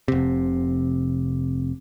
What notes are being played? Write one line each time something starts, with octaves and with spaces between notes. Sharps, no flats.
F1 C3